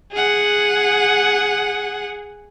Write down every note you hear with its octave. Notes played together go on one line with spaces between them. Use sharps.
G#4 F#5